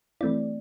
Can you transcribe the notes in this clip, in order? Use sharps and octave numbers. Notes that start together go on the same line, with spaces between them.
E3 A3 C4 E4 D5